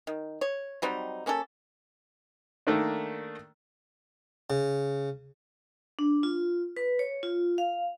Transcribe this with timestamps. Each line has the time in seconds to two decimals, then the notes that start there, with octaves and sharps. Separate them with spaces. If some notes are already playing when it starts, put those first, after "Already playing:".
0.07 D#3
0.41 C#5
0.82 F#3 G3 C4 D#4
1.26 A#3 C#4 G4 A4
2.67 D#3 A3 A#3 D4
4.50 C#3
5.99 D4
6.23 F4
6.77 B4
6.99 C#5
7.23 F4
7.58 F5